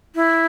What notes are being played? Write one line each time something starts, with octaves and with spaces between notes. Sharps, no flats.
E4